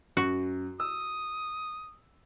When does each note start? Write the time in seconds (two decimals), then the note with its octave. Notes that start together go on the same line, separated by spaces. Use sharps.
0.17 F#2 F#4
0.80 D#6 E6